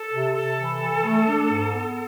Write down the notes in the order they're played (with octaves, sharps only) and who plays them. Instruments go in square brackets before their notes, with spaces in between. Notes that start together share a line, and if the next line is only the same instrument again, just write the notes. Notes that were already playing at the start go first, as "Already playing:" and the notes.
Already playing: [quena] A4
[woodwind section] C3
[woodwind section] C3 [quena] A4
[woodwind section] E3
E3
A3
D4
G#2
B3